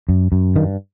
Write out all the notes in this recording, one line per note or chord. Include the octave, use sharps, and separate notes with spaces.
F#2
F#2
G2 D#3